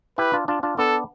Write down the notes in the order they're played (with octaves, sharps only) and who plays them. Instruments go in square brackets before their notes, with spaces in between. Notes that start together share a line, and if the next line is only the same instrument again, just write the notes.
[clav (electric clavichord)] E4 G4 [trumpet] B4
[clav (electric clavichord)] D4 F4
D4 F4
D4 F4
[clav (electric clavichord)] B3 D4 [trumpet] A4